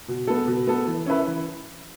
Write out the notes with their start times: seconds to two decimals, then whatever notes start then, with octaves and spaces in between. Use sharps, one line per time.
0.08 B2
0.27 B3 A4
0.47 B2
0.67 B3 A4
0.87 E3
1.06 C#4 E4 B4 E5
1.26 E3